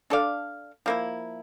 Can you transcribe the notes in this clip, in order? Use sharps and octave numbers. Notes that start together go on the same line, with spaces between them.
D4 A4 D5 F5
F3 A#3 E4